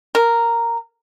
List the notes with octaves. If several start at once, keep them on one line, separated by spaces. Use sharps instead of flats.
A#4